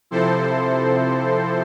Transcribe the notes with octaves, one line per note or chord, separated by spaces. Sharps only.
C3 F3 C4 E4 A4 C5